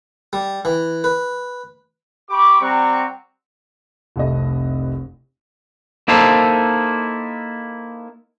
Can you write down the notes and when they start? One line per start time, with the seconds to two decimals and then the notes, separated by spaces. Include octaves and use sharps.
0.33 G3
0.65 E3
1.04 B4
2.29 G4 B5 C#6 D6
2.61 G3 C4 F#5 A#5 C#6
4.16 F1 C2 A3 D#5
6.08 A#3 D#4 E4 A4 C5